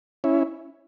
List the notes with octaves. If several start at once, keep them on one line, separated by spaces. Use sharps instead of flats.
C#4 E4